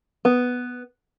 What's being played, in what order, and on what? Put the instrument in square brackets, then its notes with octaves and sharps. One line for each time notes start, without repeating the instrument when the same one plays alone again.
[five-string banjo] B3